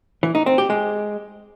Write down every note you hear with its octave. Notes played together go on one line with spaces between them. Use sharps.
E3
D#4
C4
G4
G#3